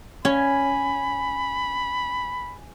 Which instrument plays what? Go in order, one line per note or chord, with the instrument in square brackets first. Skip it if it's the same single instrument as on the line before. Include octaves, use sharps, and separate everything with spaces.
[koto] C#4 [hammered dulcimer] G#5 [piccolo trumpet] B5